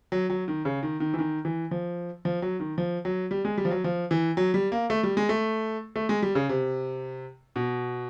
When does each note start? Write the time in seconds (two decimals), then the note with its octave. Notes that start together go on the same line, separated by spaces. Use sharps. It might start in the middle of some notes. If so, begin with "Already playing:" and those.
0.12 F#3
0.30 F#3
0.48 D#3
0.65 C#3
0.83 D#3
1.00 D#3
1.14 E3
1.19 D#3
1.45 E3
1.71 F3
2.25 F3
2.42 F#3
2.60 D#3
2.78 F3
3.05 F#3
3.31 G3
3.45 G#3
3.58 G3
3.65 F3
3.71 F#3
3.84 F3
4.11 E3
4.37 F#3
4.54 G3
4.72 A#3
4.90 A3
5.03 G3
5.17 G#3
5.29 A3
5.96 A3
6.09 G#3
6.22 G3
6.35 C#3
6.49 C3
7.56 B2